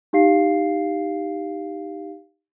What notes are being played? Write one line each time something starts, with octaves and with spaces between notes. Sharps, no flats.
D#4 G4 F5 C7